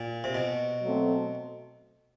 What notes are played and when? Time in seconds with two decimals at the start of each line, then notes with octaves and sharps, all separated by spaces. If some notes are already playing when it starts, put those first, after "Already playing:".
Already playing: A#2
0.24 C3
0.35 B2
0.82 F#3 A3 C4